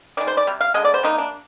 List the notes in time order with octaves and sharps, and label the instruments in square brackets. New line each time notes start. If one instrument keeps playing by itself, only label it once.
[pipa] D#3 G#3 D5
C5
D5
C3 G3
F5
D3 G#3 D#5
D5
C5
C3 G3 A#3 D#4
D4